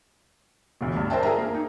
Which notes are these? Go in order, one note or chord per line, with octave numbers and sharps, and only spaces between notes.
E1 D2
G2
A#4 C5 D5 E5 G5 A5
G#4 A#4 E5 A#5
A#3
D#4